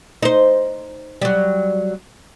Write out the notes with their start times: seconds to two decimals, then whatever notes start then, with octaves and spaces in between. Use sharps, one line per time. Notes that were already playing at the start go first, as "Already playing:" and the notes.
0.23 D#4 C5
1.22 F#3 G3